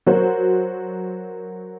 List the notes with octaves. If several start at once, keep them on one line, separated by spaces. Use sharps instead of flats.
F#3 F#4 A#4 C5